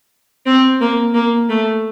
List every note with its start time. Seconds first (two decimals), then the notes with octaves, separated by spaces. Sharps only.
0.46 C4
0.80 A#3
1.14 A#3
1.49 A3